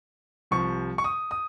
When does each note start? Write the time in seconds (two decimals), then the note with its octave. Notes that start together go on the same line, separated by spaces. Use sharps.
0.51 C2 C3 F3 C#6
0.98 C#6
1.04 D#6
1.31 D#6